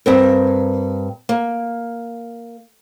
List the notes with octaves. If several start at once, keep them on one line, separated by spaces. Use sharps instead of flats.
G2 C4 A#4
A#3